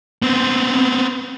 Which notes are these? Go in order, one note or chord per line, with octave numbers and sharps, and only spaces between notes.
B3 C4